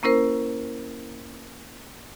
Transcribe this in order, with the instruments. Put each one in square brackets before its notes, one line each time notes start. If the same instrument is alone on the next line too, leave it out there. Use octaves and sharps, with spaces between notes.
[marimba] A#3 C#4 E4 A#4 C5